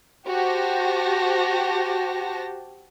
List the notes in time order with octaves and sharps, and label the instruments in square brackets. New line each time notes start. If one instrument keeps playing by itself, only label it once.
[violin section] F#4 G4 C5 A5 A#6